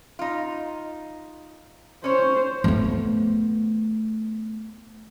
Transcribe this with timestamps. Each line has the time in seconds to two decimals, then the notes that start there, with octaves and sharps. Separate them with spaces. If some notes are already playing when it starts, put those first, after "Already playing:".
0.19 D#4 F4
2.04 C#4 C5 C#5
2.64 A3 B3